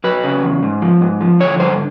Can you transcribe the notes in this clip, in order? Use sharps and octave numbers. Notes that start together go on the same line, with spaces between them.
F#3 B4
C#3
E2
G#2
F3
G#2
F3
D3 C#5
G2 C5